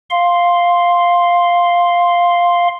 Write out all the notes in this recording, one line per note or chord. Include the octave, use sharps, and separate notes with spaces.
F5 C6